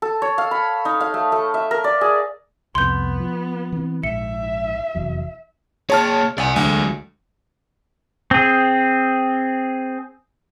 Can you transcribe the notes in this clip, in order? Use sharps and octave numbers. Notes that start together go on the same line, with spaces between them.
A4
C#5
F5
B5
D#4
F5
A3
A3
E5
A#4
D5
G#4
C2 F2 B3 C6 G6
F3
E3 C4
A#1 G#2 E5 C#7
F1 E2 F#3
A#3 G#4 C#5 A5 F6
C2 D5 G#5
D2 F#3 G#3
C4 G#4